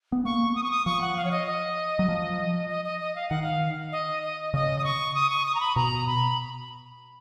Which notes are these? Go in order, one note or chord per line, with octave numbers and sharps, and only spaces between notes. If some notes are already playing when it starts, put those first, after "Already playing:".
B3
A#3 C#6
D#6
C#6
D#6
F3 C#6
F#5
F5
C#5
D#5
D#5
F#3
F3
D#5
D#5
D#5
F5
D#3 F#5
F5
D#5
D#5
C#3 D#5
D#6
C#6
D#6
C#6
D#6
A#5
B5
B2 A#5
B5